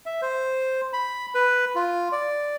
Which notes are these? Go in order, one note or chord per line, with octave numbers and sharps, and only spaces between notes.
E5
C5
B5
B4
F4
D5